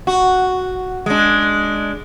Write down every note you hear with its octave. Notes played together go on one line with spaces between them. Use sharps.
F#4
G#3 D4